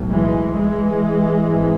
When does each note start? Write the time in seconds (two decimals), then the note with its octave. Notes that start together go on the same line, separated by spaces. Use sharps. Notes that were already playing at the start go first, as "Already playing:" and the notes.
Already playing: B1 A2
0.10 E3 G#3
0.55 E3 G#3
1.45 G#1 G#2